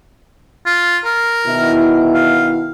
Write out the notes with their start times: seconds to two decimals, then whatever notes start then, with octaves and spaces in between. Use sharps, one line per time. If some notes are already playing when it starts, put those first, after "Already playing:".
0.66 F4
1.04 A#4
1.47 B2 D#3 E4
2.14 F5